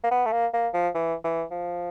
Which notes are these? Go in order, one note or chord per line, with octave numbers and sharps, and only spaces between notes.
A#3
B3
A3
A#3
A#3
F3
E3
E3
F3